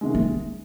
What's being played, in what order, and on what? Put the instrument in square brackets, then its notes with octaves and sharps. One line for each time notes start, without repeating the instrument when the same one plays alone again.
[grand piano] C3 D#3 G#3
[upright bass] A#3